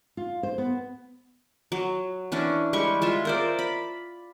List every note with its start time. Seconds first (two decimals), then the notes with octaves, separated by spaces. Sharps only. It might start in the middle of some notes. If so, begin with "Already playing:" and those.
0.17 F4
0.43 C5
0.58 B3
1.72 F#3
2.32 E3 C#4 D4
2.73 G3 G#3 C#6
3.02 G#3 F4 E5
3.25 A#4 C5 D5
3.59 B5